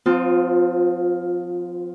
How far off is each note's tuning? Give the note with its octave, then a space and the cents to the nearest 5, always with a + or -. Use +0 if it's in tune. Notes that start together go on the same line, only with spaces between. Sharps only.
F3 +30 C4 -25 F4 +10